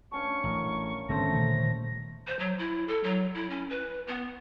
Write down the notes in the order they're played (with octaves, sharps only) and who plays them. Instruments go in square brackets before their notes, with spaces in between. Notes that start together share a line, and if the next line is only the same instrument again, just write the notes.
[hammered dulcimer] G2 C#4 A5 [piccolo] C#6
[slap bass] A1 [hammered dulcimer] A#4
[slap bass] G#1 B3 C#4 [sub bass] D3 [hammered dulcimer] A3 C5 [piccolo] A#6
[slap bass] A#2 D#3
[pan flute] C5
F#3
E4
A4
F#3
E4
C#4
B4
B3